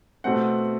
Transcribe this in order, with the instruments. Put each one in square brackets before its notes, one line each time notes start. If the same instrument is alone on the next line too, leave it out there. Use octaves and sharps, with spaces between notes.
[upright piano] B2 A3 C4 F#5